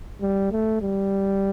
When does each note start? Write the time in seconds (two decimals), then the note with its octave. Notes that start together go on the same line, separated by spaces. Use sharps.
0.21 G3
0.51 A3
0.82 G3